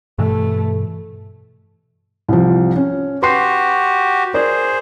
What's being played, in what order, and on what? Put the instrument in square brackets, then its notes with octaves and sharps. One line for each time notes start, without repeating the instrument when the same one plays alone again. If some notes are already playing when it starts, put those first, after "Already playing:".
[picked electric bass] G2 B2 E3 [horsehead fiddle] A3
[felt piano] C2 F3
C#4
[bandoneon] F#4 G4 [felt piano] B4 C6 C7
[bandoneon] G#4 C5 [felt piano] A#4 D5